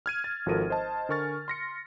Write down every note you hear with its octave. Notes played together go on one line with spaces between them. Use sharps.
F6 G#6 D#7
A6
G#1 F3 F#4 A4 A#4 D#7
C5 D#5 A5
D3 A#4 G#5 C#6 F6 A6
C6 A#6 C#7